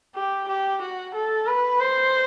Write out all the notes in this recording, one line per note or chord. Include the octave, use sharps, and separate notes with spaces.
G4
G4
F#4
A4
B4
C5